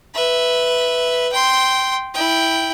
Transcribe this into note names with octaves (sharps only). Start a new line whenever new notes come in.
B4 E5
G5 C6
E4 G5